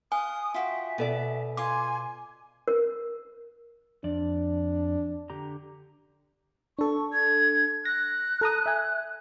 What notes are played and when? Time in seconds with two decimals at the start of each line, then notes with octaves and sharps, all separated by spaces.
0.12 F5 G#5 D#6
0.54 F4 F#4 E5 G5
0.98 B2 A4 D5
1.57 F4 G#5 C6 D6
2.68 A#4
4.04 F2 D4 D5
5.30 D3 G4 A#5
6.79 D4 A4 C#6
7.13 G#6
7.85 F#6 A#6
8.41 A4 A#5 D#6
8.66 E5 G#5